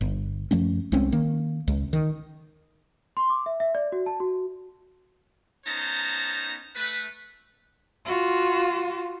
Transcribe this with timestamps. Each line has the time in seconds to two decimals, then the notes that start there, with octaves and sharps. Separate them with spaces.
0.01 G1
0.51 F#2 F3 A3 C#4
0.92 C2 G#3 C4 C#4
1.12 D#3 A#3
1.68 C#2
1.93 D#3
3.17 C6
3.29 D6
3.46 E5
3.60 E5
3.75 D5
3.92 F#4
4.06 A5
4.20 F#4
5.66 B3 C#4 D#4 C5 A5 A#5
6.76 A3 B4
8.06 F4 F#4